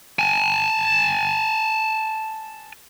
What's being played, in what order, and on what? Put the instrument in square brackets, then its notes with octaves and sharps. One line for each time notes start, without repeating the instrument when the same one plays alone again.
[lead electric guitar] G#5 A5